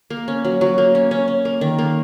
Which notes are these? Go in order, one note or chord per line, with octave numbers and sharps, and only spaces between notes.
A#3
C#4
F#3
F#3
A#3
C#4
C#4
C#4
A#3
D#3
A#3